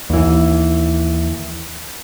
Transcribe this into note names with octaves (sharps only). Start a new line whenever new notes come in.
D#2 E3